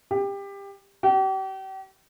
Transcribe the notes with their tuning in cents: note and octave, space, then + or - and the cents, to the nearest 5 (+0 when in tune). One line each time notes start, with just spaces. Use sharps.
G4 +20
G4 -40